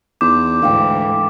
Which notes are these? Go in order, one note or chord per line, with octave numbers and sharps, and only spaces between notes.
E2 D#4 C6 D6 G6
D2 G#2 E3 A4 F5 G5